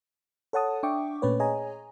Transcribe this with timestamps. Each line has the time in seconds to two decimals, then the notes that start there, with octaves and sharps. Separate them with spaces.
0.53 A4 C#5 F#5 A5 D#6
0.83 D4 E5 G5 C#6 D6
1.22 A#2 A3 C#4 B4 C#5
1.40 G#4 C#5 D#5 G#5 A#5